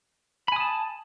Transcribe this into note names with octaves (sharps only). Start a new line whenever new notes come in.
G#5 A5 B5 D#6